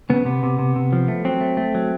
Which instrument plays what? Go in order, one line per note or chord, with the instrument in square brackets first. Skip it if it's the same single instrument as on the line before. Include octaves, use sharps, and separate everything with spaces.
[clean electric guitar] C#3 B3
C3 B3
C3
C3
C3
F3
A3
F#3 C4
A3
A3
F#3